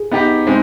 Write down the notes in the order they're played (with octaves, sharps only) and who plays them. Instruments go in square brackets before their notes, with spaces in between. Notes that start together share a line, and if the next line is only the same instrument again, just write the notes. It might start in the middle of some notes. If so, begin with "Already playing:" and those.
Already playing: [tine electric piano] G#4
[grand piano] B3 D#4 G4
G#3 C4 D#4